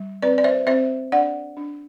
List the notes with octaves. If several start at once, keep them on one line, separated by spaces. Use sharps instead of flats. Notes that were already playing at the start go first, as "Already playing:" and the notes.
Already playing: G3
C4 B4 D5
D5
C5 E5
C4 C5 E5
D4 D5 F#5
D4